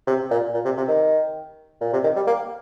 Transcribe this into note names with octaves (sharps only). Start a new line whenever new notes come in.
C3
A#2
A#2
C3
C3
D#3
A#2
C3
D#3
G3
A#3